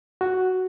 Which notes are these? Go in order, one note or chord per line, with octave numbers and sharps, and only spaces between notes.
F#4